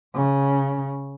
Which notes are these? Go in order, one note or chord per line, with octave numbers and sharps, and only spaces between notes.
C#3